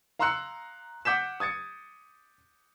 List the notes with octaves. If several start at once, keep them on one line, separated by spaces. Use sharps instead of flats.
F5 A#5 C6 E6 F#6 C#7
F#5 D6 G6 B6 E7
D#6 G#6 A6 C#7